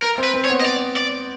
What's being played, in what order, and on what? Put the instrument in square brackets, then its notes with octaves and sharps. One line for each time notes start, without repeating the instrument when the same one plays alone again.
[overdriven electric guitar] A#4
[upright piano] C4
[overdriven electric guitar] B4
[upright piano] C4
[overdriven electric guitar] C#5
[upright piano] B3
[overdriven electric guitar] D#5
D5
D5